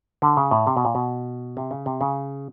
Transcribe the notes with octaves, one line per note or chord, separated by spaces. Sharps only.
D3
C#3
A2
C3
B2
A#2
B2
C3
C#3
C3
C#3